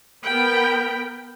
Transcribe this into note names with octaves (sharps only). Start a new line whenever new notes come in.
B3 A#4 G5 B5